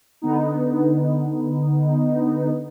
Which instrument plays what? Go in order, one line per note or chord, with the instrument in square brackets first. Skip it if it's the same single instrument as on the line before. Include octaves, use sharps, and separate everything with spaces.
[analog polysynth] D3 B3 D#4